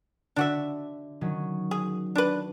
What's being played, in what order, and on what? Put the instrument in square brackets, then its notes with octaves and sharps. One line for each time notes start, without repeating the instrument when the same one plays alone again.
[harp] D3 [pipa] D4 F#4 E5
[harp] D#3 F#3 C#4
[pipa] G#4
D4 B4